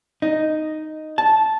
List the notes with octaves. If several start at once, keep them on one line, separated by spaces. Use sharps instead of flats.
D#4
A5